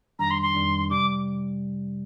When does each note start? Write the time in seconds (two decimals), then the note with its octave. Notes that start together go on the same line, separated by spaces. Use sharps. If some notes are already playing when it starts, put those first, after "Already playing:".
0.19 F2 D#3 G3 D4 A#5
0.31 C6
0.42 C6
0.54 F2 D#3 G3 D4
0.90 C3 G3 D6